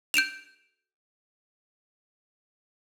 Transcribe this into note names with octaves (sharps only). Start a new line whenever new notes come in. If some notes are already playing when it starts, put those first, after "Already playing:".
G6 D7 E7 F7